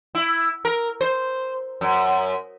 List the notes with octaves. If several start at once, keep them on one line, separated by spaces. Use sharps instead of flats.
E4
A#4
C5
F#2